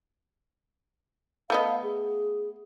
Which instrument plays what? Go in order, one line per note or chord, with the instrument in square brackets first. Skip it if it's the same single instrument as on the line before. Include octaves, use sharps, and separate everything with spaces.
[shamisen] A3 B3 D#5 [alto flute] F5
[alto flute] G#4